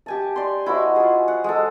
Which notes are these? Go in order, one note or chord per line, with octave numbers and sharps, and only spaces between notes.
G4 G#5 A5
D5 C6
E4 F#4 C5 D#5
F4 G#4
F#5
G#3 A4